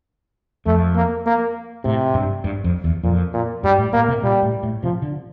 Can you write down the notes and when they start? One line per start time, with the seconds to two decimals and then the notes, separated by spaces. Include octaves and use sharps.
0.66 F2 A3
0.95 A#3
1.26 A#3
1.84 A2 C3
2.14 G2
2.44 G2
2.64 F2
2.84 E2
3.03 F2 A#2
3.33 A#2
3.63 G2 G3
3.78 A2
3.93 A2 A#3
4.08 C3
4.23 A#2 G3
4.42 A2
4.63 A2
4.83 C3 F3
5.02 D3